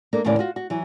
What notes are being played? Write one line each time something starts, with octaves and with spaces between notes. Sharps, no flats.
A#3 D4 A4
D#2 A2 C#3 E3 C#4 D5
F4 F#4
F#4
E3 F#3